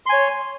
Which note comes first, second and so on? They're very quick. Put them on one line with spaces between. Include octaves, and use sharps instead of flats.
C6 G#5 C#5